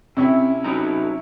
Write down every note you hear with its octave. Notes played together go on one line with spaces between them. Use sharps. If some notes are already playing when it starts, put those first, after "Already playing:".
C3 C4 C#4 E4
F#3 D#4 A#5